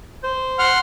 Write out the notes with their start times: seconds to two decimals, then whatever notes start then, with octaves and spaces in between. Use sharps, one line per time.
0.23 C5
0.59 F#5 C6 F6